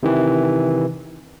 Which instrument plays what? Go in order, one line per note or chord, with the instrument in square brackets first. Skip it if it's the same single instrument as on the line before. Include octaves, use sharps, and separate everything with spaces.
[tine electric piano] C3 D#3 E3